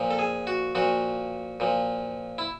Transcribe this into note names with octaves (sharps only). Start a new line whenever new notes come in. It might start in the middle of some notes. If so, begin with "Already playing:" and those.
Already playing: A#2 F3
A4
G#4
F#4
A#2 F3 F#4
A#2 F3
E4